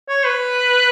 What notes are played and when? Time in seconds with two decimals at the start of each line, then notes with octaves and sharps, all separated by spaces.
0.09 C#5
0.26 B4